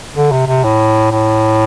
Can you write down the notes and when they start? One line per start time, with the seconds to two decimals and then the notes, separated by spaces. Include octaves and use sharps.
0.15 D3
0.32 C3
0.47 C3
0.64 A2
1.11 A2